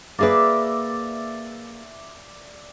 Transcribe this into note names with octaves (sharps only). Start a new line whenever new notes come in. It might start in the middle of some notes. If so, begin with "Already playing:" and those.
A#3 G#4 B4 D5 E5 D6